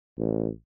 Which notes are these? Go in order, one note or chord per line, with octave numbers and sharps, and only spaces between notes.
A1